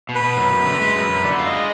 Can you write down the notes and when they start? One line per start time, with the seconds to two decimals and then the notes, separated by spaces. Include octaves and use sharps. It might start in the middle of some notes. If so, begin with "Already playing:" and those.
0.09 B2
0.15 B4
0.22 B2
0.37 F#2
0.52 F#2
0.66 D3
0.81 G#3
0.96 F#2
1.09 F#2
1.24 D3 D5
1.39 F4
1.46 D#5
1.53 G#3